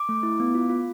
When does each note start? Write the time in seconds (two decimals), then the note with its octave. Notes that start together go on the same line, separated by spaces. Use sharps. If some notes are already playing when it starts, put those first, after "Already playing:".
Already playing: D6
0.09 A3
0.23 E4
0.40 B3
0.55 F4
0.70 F4